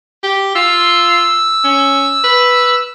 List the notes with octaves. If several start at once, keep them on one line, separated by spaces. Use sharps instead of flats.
G4
F4 E6
C#4
B4